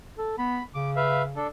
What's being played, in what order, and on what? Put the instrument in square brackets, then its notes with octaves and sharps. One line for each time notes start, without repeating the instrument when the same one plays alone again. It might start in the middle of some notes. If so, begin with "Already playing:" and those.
[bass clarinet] A4
[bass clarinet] B3 [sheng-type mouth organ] B5
[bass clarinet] C#3 [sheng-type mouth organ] D6
[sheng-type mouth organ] B4 E5 F5
D4 A4